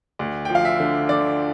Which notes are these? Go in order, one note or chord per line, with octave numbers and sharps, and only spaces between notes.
D2
F3 G5
F5
E5
D3
D3 D5